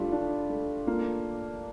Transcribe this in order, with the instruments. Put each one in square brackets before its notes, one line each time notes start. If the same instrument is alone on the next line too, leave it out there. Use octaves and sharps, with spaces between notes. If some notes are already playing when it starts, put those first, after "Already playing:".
Already playing: [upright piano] G3 A3 [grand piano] D4 F4
[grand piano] D4
A3
[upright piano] A#3 [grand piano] F4